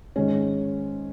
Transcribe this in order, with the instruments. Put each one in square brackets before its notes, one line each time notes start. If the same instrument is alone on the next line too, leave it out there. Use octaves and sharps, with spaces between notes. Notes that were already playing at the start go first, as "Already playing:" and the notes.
[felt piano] G#2 D#3 G#3 C#4